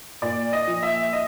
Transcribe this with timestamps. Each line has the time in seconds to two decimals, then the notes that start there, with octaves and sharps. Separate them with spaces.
0.22 A#2 D5
0.53 D#5
0.67 F3
0.83 E5
1.13 D#5